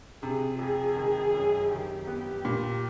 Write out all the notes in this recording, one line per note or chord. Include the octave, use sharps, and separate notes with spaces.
C3 G#4
F2 G#4
D#3
F#2
D#3 G4
B3
A#2